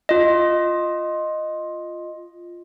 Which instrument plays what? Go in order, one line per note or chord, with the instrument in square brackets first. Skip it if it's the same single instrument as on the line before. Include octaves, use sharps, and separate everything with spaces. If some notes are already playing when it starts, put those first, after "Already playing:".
[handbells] F4 D#5